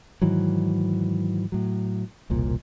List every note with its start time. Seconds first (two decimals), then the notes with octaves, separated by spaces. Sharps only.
0.22 G#2 D#3 E3 F#3
1.52 A2 F#3
2.30 E1 C2 A#2